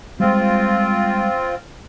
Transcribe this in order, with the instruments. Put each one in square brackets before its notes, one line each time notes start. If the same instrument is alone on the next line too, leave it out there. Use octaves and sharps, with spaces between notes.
[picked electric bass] G3 G#3 [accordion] C4 F4